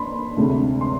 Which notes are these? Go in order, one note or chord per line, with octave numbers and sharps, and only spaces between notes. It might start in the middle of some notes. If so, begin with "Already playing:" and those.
Already playing: B5 C6
D2 C3 G#3 D4
C6